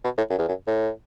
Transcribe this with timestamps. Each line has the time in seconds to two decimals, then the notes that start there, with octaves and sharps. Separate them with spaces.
0.04 B2
0.18 A2
0.30 F#2
0.38 E2
0.48 F#2
0.67 A2